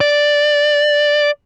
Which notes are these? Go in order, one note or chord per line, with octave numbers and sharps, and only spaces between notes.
D5